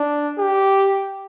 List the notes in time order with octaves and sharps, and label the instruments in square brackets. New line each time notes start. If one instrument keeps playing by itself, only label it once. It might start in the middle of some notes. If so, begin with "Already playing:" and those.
Already playing: [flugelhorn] D4
G4